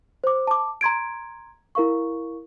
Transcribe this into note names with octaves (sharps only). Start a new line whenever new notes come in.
C5 D6
A5 D6
A#5 C6 G#6 D7
E4 A#4 F5 C#6